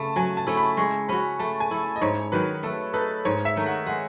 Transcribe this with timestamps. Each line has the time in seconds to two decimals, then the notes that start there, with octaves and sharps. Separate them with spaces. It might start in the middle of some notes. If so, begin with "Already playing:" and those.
Already playing: C#3 A3 A5 B5
0.16 F#3 G#5
0.37 A5
0.47 A3 C#4 E4
0.57 B5
0.77 G#3 C#6
1.09 C#4 F#4 B5
1.39 A3 A5
1.60 G#5
1.71 E4 A4
1.96 D#5
2.02 G#2 C#5
2.32 D#3 F#3 B4
2.63 A3 A4
2.93 D#4 A4 B4
3.25 G#2 C#5
3.45 E5
3.56 D#3 A3 D#4
3.66 F#5
3.87 G#3 F#5